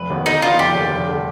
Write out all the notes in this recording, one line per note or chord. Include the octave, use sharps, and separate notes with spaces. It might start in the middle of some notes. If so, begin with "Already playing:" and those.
Already playing: F1 B4
D#2 D#3 B3
D3 D#4
F3 B3 D4 F4
F1 G4
D#2 D3
F1
D3 G3